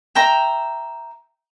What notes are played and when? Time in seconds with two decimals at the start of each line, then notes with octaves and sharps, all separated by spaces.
0.15 E5 G5 A#5